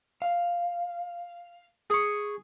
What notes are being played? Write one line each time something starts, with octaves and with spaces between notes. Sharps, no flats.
F5
G#4 C#6